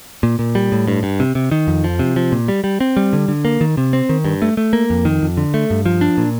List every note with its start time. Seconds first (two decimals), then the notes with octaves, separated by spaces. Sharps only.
0.23 A#2
0.39 A#2
0.55 G3
0.72 A2
0.87 G2
1.03 G2
1.20 C3
1.35 C3
1.51 D#3
1.67 F2
1.84 F3
1.99 C3
2.16 F3
2.32 A#2
2.48 G3
2.64 G3
2.80 C4
2.97 G3
3.13 D3
3.28 D3
3.45 A#3
3.61 D#3
3.77 C3
3.93 C4
4.09 D#3
4.24 G2
4.42 A3
4.57 A3
4.73 A#3
4.90 F2
5.05 D#3
5.22 F2
5.37 D3
5.54 A3
5.70 G2
5.86 F3
6.01 D4
6.17 A#2